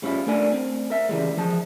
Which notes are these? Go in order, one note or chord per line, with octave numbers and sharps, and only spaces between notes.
G#2 G3 C#4 E4 F4
A3 D4 A#4 D5 G#5
C4
A#4 E5
C#3 E3 G3 G#3
F3 G#4 A5